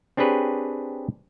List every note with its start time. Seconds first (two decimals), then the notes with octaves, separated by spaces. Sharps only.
0.17 C4 D4 G4 G#4 B4 C#5